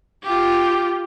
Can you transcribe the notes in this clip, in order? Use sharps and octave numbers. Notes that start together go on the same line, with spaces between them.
F4 G4